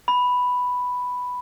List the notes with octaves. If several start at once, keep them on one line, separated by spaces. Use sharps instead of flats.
B5